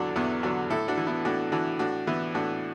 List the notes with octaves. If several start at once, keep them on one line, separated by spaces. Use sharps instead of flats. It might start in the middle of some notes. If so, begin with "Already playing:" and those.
Already playing: E2 D3 F#3 D4 E4 F#4 A4
E2 B3 E4
D3 F#3 D4 F#4
A2 E4 A4
D4 F#4
E3
B3 E4
A2 D4 F#4
E3 D4 F#4
A2 D4 F#4
E3 B3 E4
A2 D4 F#4